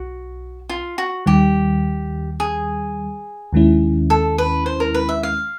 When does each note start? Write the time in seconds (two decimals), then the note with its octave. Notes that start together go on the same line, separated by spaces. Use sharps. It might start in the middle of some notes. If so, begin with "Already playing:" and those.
Already playing: B1 F#4
0.69 F4
0.98 F#4
1.26 D#2 D#3 G3 G4
2.40 G#4
3.53 D#2 D#3 G#3 C#4 E4
4.10 A4
4.38 B4
4.66 C5
4.80 A#4
4.94 B4
5.09 E5
5.23 F5